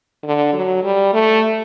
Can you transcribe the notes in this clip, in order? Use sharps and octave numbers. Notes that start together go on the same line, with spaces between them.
D3
F#3
G3
A3